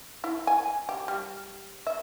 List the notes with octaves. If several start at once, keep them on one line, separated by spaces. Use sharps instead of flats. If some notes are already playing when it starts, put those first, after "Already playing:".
E4
G#5
G4
G3
E5